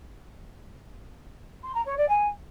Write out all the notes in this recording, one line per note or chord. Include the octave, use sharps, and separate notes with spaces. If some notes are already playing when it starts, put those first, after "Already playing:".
C6
A#5
C#5
D5
G#5